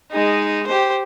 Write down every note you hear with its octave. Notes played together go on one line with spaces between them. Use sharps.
G#3 D#4
G4 C5